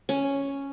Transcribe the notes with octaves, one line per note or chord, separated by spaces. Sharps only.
C#4